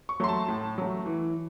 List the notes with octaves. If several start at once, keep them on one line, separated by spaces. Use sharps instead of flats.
C#6
F#3 A3 C6
A5
A2
F#3 A3
E3